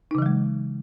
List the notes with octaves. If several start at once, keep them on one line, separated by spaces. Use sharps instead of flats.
C#3 E3 F#3 G#3 D#4